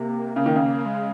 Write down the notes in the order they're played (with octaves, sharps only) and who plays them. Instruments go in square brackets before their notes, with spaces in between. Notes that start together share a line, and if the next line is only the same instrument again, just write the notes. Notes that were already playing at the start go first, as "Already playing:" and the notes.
Already playing: [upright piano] C3 [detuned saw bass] A#3
[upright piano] C#3
D#3
C#3
[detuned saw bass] G#3